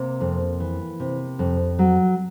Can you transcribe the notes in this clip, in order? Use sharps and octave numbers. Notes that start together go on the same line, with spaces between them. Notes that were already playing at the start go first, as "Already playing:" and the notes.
Already playing: C3 A#3
F2
E3
C3
F2
F#3